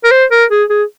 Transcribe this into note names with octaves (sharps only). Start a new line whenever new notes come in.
A#4
C5
A#4
G#4
G#4